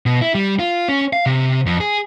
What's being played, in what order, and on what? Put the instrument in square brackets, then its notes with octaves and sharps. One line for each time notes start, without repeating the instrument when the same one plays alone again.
[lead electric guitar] B2
E4
G3
F4
C#4
F5
C3
F2
G#4